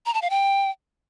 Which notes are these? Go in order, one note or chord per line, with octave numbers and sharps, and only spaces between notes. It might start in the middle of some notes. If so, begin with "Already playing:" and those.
A#5
A5
F5
G5